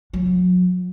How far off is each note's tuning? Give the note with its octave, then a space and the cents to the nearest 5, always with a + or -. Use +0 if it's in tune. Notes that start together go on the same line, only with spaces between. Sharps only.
F#3 -35